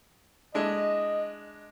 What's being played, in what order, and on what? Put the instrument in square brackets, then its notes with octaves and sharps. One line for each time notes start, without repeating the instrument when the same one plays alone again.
[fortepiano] G#3 D4 E4 [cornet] D#5